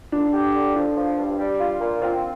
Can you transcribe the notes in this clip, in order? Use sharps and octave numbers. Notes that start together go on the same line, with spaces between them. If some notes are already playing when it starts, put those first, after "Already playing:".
D3 D4
G4
D3
F3 D4
F3
G2
G3
F4
A#2
C4 F4